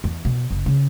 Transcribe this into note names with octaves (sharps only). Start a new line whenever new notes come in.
E2
B2
F#1
C#3